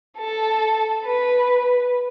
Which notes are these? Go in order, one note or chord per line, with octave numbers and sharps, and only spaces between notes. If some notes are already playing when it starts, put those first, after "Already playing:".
A4
B4